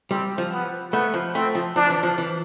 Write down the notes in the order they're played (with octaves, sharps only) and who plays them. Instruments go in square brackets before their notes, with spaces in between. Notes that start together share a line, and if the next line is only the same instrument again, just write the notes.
[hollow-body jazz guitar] G3 [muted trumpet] C4
[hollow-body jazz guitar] F3
[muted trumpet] B3
[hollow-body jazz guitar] A3 [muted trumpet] B3
[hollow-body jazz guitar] F3
[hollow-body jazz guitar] A3 [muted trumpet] C4
[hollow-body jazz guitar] F3
[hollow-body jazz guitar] F3 [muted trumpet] D4
[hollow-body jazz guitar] E3
F3
E3